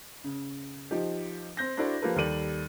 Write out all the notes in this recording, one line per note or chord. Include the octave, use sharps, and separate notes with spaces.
C#3
F3 D#4 G4
C4 G6 A#6
D4 E4 F#4 A4 C5 D5
F3 A#3 G4 A4 B4
D#2 G3 A4 D5 D#7 F#7